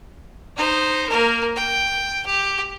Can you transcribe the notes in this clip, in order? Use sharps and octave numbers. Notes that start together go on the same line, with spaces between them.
D#4 C5
A#3 A#4
G5
G4